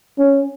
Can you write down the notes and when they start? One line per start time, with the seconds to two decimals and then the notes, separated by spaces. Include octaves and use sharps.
0.18 C#4